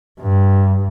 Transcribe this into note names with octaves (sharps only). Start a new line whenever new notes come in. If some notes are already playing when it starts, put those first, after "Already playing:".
G2